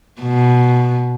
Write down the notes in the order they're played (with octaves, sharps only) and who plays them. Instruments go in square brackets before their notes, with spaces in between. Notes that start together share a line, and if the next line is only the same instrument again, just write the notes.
[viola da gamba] B2